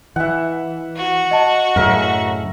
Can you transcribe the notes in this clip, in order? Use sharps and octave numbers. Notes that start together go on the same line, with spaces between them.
E3 E5 F#5
F#4
D#5 A5
F#2 A2 C#3 A#4 E5